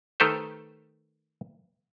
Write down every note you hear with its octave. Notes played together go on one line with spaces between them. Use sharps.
D#3 A3 G4 A4 B4 C5